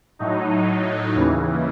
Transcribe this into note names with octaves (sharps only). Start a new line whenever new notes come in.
A2 F#3 D#4
D#2 C#3 E3